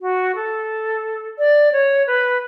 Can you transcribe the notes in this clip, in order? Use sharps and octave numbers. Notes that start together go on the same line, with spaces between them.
F#4
A4
D5
C#5
B4